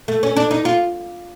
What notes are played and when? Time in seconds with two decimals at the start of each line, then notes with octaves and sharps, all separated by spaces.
0.08 A3
0.23 C#4
0.36 D4
0.51 D#4
0.65 F4